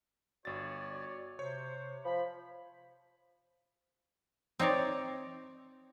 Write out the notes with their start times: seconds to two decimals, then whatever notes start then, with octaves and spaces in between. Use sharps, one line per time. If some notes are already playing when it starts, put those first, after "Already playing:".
0.45 G1 F#4 C#5 D5 A6
1.39 C3 C5 C#5
2.05 F3 B5
4.59 C4 D#4 C#5 D5